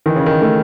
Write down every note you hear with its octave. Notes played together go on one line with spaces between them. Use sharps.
D#3 E3
C#3
D#3
A3